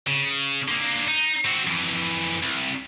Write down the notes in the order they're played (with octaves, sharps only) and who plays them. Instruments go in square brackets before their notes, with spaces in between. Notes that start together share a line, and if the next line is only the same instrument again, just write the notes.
[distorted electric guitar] C#3
D3 A#3
D#4
C4 F#4
F2 E3
C2